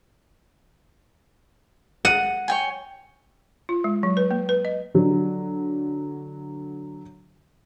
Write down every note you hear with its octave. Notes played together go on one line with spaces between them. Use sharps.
F#5 D#7
C#5 G5 G#5
F4
G#3
F#3
B4
A#3
B4
D#5
D3 F#3